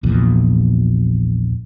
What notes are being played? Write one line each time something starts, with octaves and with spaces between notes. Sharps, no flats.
A#1 E2 A#2